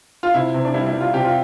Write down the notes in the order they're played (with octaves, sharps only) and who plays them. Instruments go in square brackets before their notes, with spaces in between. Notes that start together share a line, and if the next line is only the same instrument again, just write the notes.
[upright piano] F4
C3 E4
C3
D4
G3 E4
E4
G3
F4
C3 G4
F4